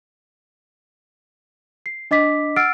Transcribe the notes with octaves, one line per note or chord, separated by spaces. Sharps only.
C7
D4 D#5 D6 B6
F#5 E6 F6 A6 C7 D7